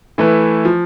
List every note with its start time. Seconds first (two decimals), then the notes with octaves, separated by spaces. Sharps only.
0.18 E3 A3 E4 B4
0.65 F3